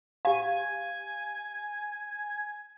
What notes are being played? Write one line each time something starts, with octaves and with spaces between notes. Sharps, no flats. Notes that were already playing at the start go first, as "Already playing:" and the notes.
G4 F5 G#5